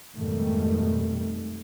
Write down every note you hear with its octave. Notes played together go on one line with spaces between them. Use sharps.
F2 G#2 B2 D#3 G3 A3